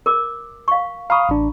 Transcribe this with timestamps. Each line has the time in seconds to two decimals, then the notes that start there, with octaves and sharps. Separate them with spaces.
0.06 A#4 D6
0.68 F5 C#6
1.10 F5 A#5 B5 C#6 D#6
1.29 A1 D4